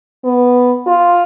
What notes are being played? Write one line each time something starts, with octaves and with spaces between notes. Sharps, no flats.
B3
F4